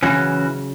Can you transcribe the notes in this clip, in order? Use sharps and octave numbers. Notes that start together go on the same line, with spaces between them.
C#3 E3 F#3 C#4 F#4